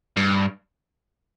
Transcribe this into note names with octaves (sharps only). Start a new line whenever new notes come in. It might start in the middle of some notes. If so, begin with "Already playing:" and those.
G2